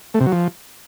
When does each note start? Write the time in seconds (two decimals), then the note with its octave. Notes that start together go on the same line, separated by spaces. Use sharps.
0.14 A3
0.20 C3
0.26 F#3
0.32 F3